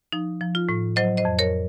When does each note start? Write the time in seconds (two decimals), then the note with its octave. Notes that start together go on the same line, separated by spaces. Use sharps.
0.12 F3 D#4
0.41 F3
0.55 F4
0.69 A2
0.96 F#3 C5 D#5
1.17 C5 D#5
1.25 F2
1.39 A#4 C#5